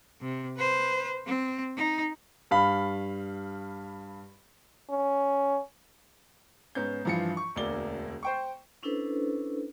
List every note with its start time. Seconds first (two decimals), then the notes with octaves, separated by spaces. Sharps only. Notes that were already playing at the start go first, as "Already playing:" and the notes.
0.21 C3
0.57 B4 C5
1.26 C4
1.77 D#4
2.51 G2 F5 B5
4.90 C#4
6.75 G#2 B3 C#4 G6
7.05 G2 E3 F3 F5 C#7
7.37 C#6
7.56 E1 D2 A#3 D5 G7
8.23 C5 G5 C#6
8.83 C#4 D4 E4 A4 B4 C5